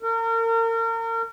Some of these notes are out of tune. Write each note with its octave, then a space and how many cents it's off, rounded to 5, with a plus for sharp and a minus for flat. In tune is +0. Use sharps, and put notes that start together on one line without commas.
A#4 -35